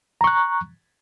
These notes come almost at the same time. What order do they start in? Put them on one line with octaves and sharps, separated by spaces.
A#5 C#6 F#6